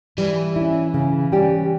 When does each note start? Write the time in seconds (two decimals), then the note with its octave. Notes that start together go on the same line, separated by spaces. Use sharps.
0.18 E3 G3
0.56 C#4 E4
0.94 C#3
1.32 G3 C#4 G4